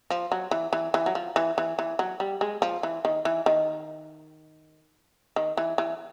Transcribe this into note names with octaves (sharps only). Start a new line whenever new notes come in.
F3
F#3
E3
E3
E3
F#3
F3
E3
E3
E3
F#3
G3
G#3
F3
E3
D#3
E3
D#3
D#3
E3
E3